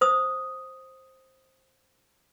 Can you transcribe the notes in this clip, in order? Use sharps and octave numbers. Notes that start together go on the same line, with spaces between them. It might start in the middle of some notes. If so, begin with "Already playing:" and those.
C5 D#6